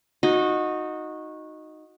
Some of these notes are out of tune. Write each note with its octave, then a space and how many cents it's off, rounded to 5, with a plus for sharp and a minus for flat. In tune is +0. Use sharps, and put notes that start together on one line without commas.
D#4 +0 F#4 -20